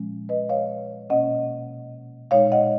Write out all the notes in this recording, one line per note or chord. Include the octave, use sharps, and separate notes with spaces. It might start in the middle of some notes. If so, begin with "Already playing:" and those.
Already playing: A#2 F3 G#3 C#4
B4 D#5
C#5 F5
B2 A#3 C#4 D#5 F#5
A#2 G#3 D#4 C#5 F5
D#5 F#5